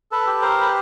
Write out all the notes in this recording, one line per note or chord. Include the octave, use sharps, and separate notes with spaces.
A4 B4
G4
A#4 C5
B4